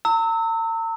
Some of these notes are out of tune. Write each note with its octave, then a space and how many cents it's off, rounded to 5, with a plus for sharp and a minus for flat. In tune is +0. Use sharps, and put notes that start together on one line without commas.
A#5 -45 E6 -25